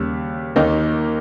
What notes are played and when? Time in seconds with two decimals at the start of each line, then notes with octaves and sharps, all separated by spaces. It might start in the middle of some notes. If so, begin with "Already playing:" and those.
Already playing: D#2 C#3 G3
0.56 D#2 D#3 A#3 D#4